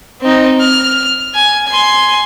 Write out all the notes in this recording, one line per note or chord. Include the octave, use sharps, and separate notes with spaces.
C4 D#4
F6
G#5
G#5 C6